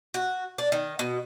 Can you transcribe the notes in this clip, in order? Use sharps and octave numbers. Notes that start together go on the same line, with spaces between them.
F#4
D4
D#3
B2